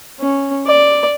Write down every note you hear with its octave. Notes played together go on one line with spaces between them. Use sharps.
C#4
D5